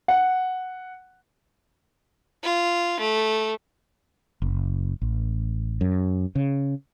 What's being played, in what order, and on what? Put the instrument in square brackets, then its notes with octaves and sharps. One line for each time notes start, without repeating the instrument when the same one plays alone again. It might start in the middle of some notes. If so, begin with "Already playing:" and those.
[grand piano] F#5
[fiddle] F4
A3
[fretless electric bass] F#1
A1
F#2
C#3